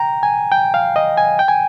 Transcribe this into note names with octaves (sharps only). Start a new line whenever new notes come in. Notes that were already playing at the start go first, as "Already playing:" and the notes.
Already playing: G5 A#5
G#5
G5
F5
D#5
G#5
G5
G#5